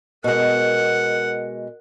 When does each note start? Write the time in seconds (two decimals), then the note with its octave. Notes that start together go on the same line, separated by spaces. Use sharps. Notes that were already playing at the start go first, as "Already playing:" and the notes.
0.24 B2 G#3 A#4 F#5